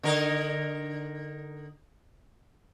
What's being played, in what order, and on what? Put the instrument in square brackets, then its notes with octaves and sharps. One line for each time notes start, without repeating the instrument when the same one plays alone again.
[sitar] D3 D#4 A#4